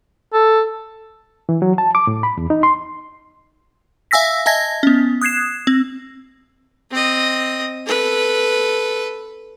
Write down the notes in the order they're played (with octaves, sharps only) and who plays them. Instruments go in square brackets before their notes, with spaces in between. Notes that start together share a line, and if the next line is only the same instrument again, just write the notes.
[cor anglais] A4
[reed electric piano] E3
F#3
A5
D6
A2
B5
E2
D#4
C6
[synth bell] E5 F5 G#5 E6 A#6 B6
D#5 E5 G#5 A5 G#6 A#6
B3 C#4
D#6 F#6 G#6 C7 E7
C4
[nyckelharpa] C4 D#5
A4 B4